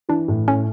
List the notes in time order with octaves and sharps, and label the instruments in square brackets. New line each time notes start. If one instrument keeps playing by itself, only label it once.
[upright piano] E3 [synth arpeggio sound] D4
[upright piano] A2
[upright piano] A3 [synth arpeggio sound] C#4